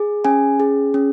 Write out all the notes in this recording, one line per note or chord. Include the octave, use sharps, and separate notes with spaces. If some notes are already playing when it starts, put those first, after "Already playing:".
Already playing: G#4
C#4 G#5
G#4
C#4